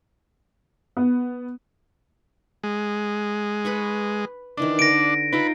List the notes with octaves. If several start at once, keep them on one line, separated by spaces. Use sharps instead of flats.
B3
G#3
B4 B5 C#6
D#3 E3 D4 D#5
D3 A#6 D7
D#4 F4 A4 B4